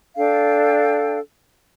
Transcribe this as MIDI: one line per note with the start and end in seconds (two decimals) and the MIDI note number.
0.17 1.19 62
0.17 1.19 69
0.17 1.19 77
0.17 1.19 79